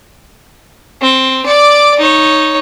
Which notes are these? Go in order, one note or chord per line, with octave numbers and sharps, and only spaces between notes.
C4
D5 D6
D#4 C#5